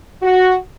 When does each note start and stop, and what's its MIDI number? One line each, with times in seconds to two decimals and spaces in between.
0.22 0.56 66